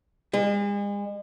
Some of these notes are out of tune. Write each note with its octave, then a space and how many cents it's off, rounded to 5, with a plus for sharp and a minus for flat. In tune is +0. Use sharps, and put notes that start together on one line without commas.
G#3 -40